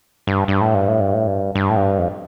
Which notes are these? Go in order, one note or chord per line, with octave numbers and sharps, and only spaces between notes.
G2
G2
A2
G2
A2
G2
A2
G2
G2
A2
G2
F2